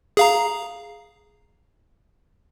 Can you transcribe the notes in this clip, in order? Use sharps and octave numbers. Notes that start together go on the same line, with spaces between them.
G#4 F5 A#5